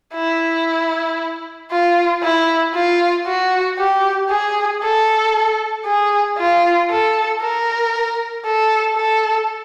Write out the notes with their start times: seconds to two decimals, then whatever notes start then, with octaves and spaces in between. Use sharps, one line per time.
0.14 E4
1.71 F4
2.22 E4
2.74 F4
3.27 F#4
3.78 G4
4.29 G#4
4.83 A4
5.86 G#4
6.38 F4
6.90 A4
7.41 A#4
8.45 A4
8.97 A4